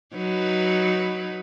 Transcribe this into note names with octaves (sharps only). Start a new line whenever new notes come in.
F#3 D#4 B4